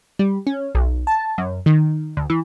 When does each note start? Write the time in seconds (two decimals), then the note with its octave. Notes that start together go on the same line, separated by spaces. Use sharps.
0.19 G3
0.47 C#4
0.75 B1
1.07 A5
1.38 F#2
1.66 D#3
2.17 D2
2.30 E3